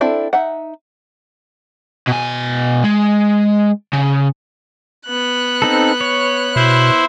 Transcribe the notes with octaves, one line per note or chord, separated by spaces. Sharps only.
C4 D4 E4 A4
D#4 E5 F#5
B2 G#5
G#3
C#3
B3 F#6
C4 D#4 A4
C#5
B2 E4 C5